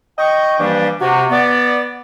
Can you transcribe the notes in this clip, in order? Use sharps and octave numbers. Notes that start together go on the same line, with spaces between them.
D#5 G5 C#6
G2 E3 F3 G3 A#3 D4
C3 F#4
B3 D5